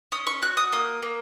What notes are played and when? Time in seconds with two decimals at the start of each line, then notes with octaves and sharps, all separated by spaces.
0.12 C#4 D#6
0.27 C#6
0.42 F#4 F#6
0.57 D#6
0.72 A#3 D#6
1.02 A#3